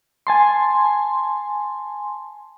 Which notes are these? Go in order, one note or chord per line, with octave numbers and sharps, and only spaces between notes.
G#5 A5 C6